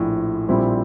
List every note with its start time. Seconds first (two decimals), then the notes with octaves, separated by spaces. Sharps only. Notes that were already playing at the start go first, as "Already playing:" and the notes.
Already playing: A#1 A2 F3
0.48 A#1 A#2 G3 C4 E4